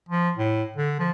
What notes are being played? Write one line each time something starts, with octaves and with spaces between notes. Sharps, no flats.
F3
A2
D3
F3